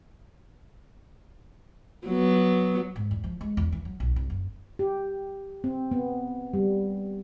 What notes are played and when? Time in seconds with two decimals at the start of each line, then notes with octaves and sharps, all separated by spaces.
2.07 F#3 B3
2.96 G#2
3.11 E2
3.24 F3
3.41 G#3
3.57 E2
3.72 E3
3.85 F#3
4.00 B1
4.16 C2
4.30 F#1
4.79 G4
5.64 C4
5.91 B3
6.53 G3